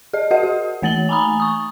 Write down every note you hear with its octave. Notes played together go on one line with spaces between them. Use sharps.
G#4 D#5
F#4 A#4 D#5 F#5
F#4
E3 A3 A6 F#7 G7
G#5 A#5 B5 D#6
C#6 D#6